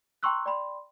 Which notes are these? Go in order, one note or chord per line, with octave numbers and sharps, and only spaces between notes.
G5 A#5 C6 C#6 E6 F#6
D5 G5 B5 C6